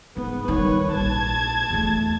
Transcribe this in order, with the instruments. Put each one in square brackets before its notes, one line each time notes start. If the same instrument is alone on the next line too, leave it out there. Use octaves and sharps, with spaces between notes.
[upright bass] G#2 [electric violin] B3
[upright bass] D#3 G3 [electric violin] B4 C#5
[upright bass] A#1 [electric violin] A5 G#6
[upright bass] E2 A3